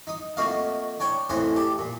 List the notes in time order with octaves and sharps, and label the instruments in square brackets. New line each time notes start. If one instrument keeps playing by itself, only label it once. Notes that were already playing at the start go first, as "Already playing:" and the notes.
[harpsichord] D#4 D#6
F2 A3 A#3 F#4 D#5 F5
D4 C#5 G5
F2 A2 E3 G#4 C5 F#5
G4 A4
A#2